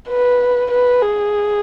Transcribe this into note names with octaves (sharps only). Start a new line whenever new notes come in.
B4
B4
G#4